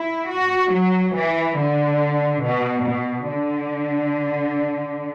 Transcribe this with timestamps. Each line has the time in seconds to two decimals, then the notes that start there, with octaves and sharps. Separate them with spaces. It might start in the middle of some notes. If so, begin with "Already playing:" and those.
Already playing: E4
0.30 F#4
0.73 F#3
1.15 E3
1.58 D3
2.45 B2
2.86 B2
3.29 D3